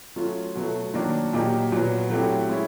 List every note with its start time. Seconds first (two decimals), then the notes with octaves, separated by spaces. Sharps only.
0.16 F#3 A3 C#4 F4
0.55 B2 F#3 A3
0.94 D#3 F#3 A#3 D4
1.33 A#2 F#3 A#3 D#4 G4
1.72 A#2 F#3 B3
2.10 F#3 A3 C4 E4 G4
2.49 G#3 C#4 E4